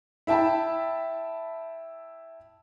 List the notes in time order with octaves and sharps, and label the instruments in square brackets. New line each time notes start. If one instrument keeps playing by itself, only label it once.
[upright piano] E4 E5 G5 A5 B5